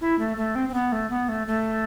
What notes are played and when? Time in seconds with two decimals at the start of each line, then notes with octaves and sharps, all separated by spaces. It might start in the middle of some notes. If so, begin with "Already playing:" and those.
0.01 E4
0.19 A3
0.37 A3
0.55 C4
0.69 C4
0.74 B3
0.92 A3
1.10 B3
1.29 A3
1.47 A3